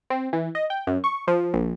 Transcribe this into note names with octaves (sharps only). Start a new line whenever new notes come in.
C4
E3
D#5
G5
F#2
C#6
F3
A#1